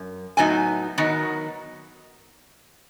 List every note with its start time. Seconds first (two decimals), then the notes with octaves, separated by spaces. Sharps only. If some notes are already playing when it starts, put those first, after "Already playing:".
Already playing: F#2
0.37 A2 F#3 B3 D#4 G#5
0.98 D#3 F#3 B3 D#4